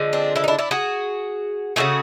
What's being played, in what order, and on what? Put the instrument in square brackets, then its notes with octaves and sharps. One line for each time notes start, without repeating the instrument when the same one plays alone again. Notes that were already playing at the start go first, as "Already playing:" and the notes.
Already playing: [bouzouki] D3 F3 G#3
C4 D4
D4 E4
D#4
D4 E4
D4 E4
F#4 G#4
C#3 F3 A3 F#4 G#4